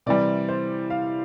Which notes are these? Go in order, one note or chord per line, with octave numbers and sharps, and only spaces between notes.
C3 E3 G3 D5
C5
F5